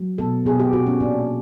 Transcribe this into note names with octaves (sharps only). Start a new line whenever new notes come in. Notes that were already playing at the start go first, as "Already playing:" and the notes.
Already playing: F#3
B2 A4
B2 G#4
G4
B2 F#4
C#4
A#2 D4